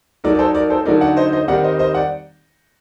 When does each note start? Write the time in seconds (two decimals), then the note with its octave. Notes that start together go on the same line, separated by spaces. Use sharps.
0.24 F#3 A3 D#4 A#4 D5
0.35 D5
0.39 A4 C5
0.55 A#4 D5
0.70 A4 C5
0.86 D3 F#3 A3 D#4 A#4 D5
1.01 D5 F#5
1.17 C5 D#5
1.32 C5 D#5
1.48 D#3 G3 C4 D#4 D5 F#5
1.64 C5 D#5
1.79 C5 D#5
1.94 D5 F#5